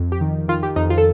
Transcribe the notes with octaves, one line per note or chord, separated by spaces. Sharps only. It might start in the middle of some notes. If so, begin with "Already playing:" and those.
Already playing: F2
G4
D#3
D#3 F4
G4
F2 D#4
F4
A4